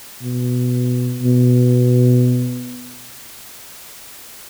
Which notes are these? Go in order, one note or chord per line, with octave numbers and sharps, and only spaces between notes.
B2
B2